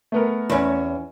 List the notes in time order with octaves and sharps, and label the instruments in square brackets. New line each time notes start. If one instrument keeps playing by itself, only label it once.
[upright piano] A3 B3 A#4
[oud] E2 C#4